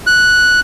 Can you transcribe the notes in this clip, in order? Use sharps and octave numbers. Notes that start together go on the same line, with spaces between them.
F#6